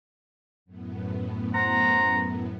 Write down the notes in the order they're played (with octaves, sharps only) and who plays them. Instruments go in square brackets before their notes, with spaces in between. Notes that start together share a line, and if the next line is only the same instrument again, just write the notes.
[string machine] F#2 A2 B3
[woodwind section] C5 F#5 A#5